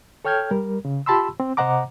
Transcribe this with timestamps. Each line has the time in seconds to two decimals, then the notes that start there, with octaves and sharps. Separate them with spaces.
0.25 A4 C#5 G5 F6 G6 G#6
0.51 G3 A#4
0.85 C#3
1.06 F4 G4 A5 B5 C6 E6
1.40 C4
1.57 C3 C5 D#5 F#5 A#5 D6